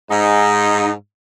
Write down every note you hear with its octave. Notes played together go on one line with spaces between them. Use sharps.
G#2 D#4